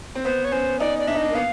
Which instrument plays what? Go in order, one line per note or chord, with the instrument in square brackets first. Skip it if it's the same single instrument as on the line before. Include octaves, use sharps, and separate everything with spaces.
[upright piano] C4
[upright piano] B3 [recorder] C5
[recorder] C#5
[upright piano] C#4 [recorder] C5
[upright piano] D#4 [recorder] D5
[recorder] D5
[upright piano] D4 [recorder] E5
[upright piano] D#4 [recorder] D#5
[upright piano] D4
A#3
[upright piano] B3 [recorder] F5